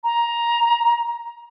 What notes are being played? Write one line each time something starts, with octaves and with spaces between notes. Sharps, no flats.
A#5